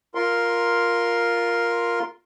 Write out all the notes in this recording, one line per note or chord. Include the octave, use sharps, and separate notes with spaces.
F4 A#4 C6